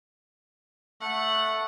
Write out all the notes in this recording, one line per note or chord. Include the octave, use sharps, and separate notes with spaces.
A3 F#5